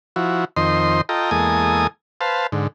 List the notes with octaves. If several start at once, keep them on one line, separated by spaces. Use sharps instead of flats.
F3 E4 F#4
F2 D#3 C5 D#5 C6
F4 A4 D#5 G5 A#5
E2 G#3 A#3 A4 G#5 D#6
B4 C5 F5 A5
G#2 D3